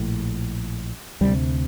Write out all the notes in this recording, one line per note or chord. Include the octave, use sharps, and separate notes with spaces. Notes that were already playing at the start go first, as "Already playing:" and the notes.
Already playing: A#1 A2
D2 C3 G3